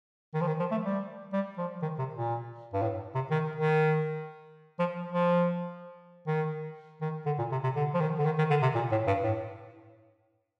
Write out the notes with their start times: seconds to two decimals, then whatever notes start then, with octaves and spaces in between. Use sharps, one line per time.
0.34 D#3
0.41 F3
0.47 D#3
0.59 F3
0.71 A3
0.84 G3
1.33 G3
1.58 F3
1.82 D#3
1.98 C3
2.15 A#2
2.73 G2
2.82 A2
3.15 C3
3.31 D#3
3.56 D#3
4.79 F3
5.12 F3
6.27 D#3
7.01 D#3
7.26 D3
7.38 A#2
7.52 C3
7.64 C3
7.76 D3
7.94 F3
8.00 D#3
8.18 D3
8.25 D#3
8.38 D#3
8.50 D3
8.62 C3
8.75 A#2
8.91 A2
9.07 G2
9.23 A2